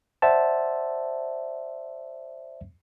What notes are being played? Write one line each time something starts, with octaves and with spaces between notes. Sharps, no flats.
C5 D5 E5 F#5 A5